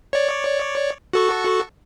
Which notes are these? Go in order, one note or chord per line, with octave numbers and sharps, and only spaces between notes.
C#5 D5
F#4 A4 C#6